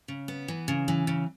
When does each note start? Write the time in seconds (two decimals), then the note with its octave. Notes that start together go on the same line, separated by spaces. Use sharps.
0.08 C#3
0.28 B3
0.48 E3
0.68 C#3
0.88 E3
1.07 C#3